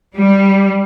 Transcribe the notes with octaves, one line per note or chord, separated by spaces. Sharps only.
G3